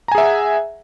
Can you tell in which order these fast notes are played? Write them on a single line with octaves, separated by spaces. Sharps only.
A#5 G#5 G#4 E5 F#5